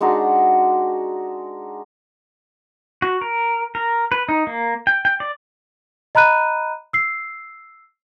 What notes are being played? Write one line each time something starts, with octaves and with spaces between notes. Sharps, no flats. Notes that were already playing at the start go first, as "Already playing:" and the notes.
G#3 D4 D#4 F#4
F#4
A#4
A#4
B4
D#4
A#3
G5
G5
D5
D#5 A#5 B5 F#6 D#7
E6 C7